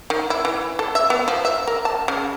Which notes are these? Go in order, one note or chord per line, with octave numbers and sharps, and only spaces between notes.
D#3
E4
E3
A4
E5
B3
F3
E5
A#4
A5
C#3